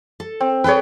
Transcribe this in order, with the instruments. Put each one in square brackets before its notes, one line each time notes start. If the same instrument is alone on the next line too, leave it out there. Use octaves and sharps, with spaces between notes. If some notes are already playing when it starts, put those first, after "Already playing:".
[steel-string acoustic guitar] A4
[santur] C4
[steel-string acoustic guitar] G#4 A4 G5 [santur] B4 C#5